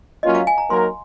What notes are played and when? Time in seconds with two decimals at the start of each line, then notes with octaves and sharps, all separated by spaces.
0.23 F#3 A#3 C#4 F4 D#5
0.35 F5
0.47 G#5
0.58 A#5
0.70 F#3 A#3 D#4 A#4 C6